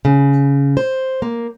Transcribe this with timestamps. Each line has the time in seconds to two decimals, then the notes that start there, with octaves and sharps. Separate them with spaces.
0.05 C#3
0.77 C5
1.22 A#3